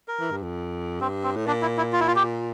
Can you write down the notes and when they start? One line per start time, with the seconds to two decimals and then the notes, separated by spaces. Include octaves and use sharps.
0.08 A#4
0.20 E3
0.31 G2
0.43 F2
1.01 G2 C4
1.23 C4
1.36 A2
1.47 A#2 D4
1.62 E4
1.77 E4
1.93 F4
2.00 E4
2.07 F4
2.16 G4